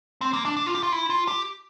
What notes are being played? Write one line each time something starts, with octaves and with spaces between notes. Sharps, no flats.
C4
A#3
D4
D4
F4
G4
F4
E4
F4
G4